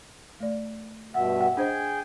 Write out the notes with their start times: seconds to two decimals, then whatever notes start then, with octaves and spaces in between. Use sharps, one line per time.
0.40 A3 D5
1.14 G2 B2 E5 F#5
1.39 F#5 G5
1.57 D4 G#4 C5 D#5 G5 G#5